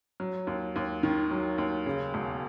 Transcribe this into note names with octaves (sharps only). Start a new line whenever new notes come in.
F#3
D#2
D#2
D#3
F#3
D#2
C#3
E1